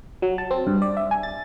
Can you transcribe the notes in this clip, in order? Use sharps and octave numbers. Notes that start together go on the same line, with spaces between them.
F#3
A5
C4
G2
D5
E5
G#5
A6